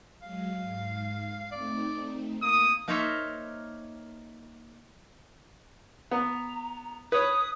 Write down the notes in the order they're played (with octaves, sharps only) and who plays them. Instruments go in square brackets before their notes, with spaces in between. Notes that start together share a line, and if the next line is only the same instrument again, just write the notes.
[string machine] F#3 G#3 [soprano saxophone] F5
[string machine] G#2
[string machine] A3 C4 D#4 [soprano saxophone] D5
[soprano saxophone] A#3 [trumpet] D#6
[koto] A#3 D#4 A#4 C5 C#5 E5
[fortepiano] B3 [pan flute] A#5
[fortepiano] B4 C#5 [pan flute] D#6